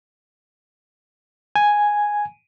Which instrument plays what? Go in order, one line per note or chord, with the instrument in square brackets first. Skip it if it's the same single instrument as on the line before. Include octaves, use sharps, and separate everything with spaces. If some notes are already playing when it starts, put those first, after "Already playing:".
[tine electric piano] G#5